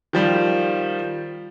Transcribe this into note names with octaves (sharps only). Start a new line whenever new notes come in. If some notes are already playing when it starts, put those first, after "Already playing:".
D#3 F3 G3